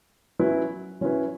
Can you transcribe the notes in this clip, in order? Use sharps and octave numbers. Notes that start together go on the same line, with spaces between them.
F#3 C#4 E4 B4
F#3 C#4 E4 B4